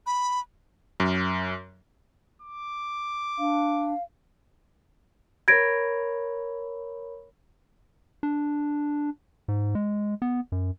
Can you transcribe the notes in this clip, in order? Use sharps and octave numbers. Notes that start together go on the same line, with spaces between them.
B5
F#2
D6
D4 F5
A#4 C#5 B5 G#6 A#6 D7
D4
G#2
G#3
B3
F#2